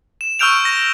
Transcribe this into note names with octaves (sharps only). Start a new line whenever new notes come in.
E7
C#6 E6 F6 G6 D7 F7
A#6